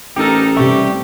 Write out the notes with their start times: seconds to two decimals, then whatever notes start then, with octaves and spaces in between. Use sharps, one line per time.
0.16 A1 D#4 G4 A4 A#4
0.56 C3 G3 G4 E5 C#6